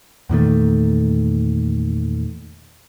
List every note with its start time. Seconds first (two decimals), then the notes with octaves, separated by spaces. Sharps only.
0.29 E2 A#2 D#3 A3